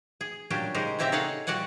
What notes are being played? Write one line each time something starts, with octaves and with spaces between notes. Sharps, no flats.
G#4
A#2 F#3 G3 C#4 D4 G4
C#3 G#3 D#4 G4 A#4 C5
A#2 C#3 C4 G4 E5 A#5
D#4 G#4 A4 C#5 F5 F#5
A#2 G3 F#4 D5 F#5 G#5